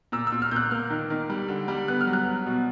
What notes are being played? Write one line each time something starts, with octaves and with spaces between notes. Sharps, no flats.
A#2 E6
E6
A#2
F6
A#2 F#6 G6
A#3 F6
D#3
D#3
G3
D3
G3
B3 F#6
F6
F#3
F#6
F#3
B2